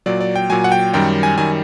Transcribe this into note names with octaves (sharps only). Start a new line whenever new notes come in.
A#2 F#3 D5
D5
G5
A#2 F#3 G#5
F#5
G5
F#2 D#3 G3 G5
G#5
F#2 D#3 G3 G#5